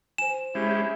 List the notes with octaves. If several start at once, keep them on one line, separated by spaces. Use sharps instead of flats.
C5 G#5 E7
G#3 C#4 E4 G4